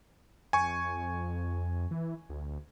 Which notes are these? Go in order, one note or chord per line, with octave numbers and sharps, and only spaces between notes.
F2 G#5 C#6
E3
D2